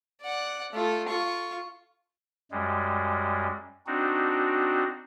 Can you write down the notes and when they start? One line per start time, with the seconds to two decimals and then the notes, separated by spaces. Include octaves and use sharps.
0.22 D5 F#5
0.73 A3 F4
1.09 F4 C#6
2.51 F#2 G3 G#3
3.87 C4 D4 D#4 F#4